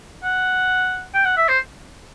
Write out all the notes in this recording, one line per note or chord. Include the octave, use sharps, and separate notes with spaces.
F#5
G5
F#5
E5
C5